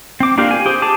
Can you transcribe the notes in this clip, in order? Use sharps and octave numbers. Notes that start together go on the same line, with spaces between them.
C4 D6
A#3 D4 F4 G4 A#4
G#5
G4 G#4 C5
G#4 A5 D6